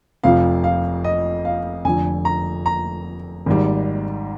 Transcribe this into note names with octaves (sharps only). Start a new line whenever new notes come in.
F1 F2 C3 F3 F5
F5
D#5
F5
F1 F2 D3 G#5
A#5
A#5
G#1 G#2 G3